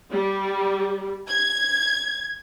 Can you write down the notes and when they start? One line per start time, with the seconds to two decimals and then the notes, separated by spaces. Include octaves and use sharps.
0.12 G3
1.29 G#6